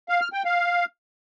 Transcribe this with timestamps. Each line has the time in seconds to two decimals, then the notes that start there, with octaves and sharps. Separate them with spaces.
0.09 F5
0.21 F6
0.33 G5
0.45 F5